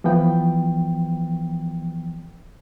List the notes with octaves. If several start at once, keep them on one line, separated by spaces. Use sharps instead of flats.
E3 F3 B3 G5